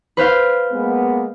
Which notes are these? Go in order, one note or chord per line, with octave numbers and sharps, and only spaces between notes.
B4 C5 F5
G#3 A#3 B3